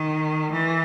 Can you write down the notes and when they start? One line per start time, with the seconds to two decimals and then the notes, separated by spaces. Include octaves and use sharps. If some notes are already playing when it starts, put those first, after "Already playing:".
Already playing: D#3
0.52 E3